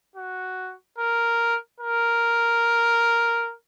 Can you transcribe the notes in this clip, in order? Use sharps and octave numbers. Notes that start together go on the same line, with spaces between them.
F#4
A#4
A#4